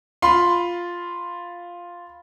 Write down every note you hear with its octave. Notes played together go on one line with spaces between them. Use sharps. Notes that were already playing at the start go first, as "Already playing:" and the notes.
F4 B5 C6